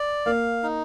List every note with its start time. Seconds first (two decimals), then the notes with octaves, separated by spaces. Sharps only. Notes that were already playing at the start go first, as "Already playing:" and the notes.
Already playing: D5
0.26 A#3 F5
0.63 D#4